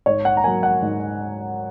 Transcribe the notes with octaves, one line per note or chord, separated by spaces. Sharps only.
G#2 C#5
F#5
A#5
F#3 A#3 G#5
F#5
G#2